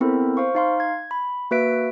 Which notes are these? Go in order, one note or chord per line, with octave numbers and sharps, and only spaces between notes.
B3 C4 E4 A4 A#4 C5
C5 F5 C#6
D#4 F5 C6
G#6
B5
A#3 F#4 B4 E5 B6 D7